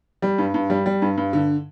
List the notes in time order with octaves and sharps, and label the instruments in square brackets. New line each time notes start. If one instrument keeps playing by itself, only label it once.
[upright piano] G3
G2
G2
G3
G3
G2
G2
D3